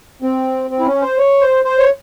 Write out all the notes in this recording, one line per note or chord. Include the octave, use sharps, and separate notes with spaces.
C4
C4
E4
C#4
C5
C#5
C5
C5
C#5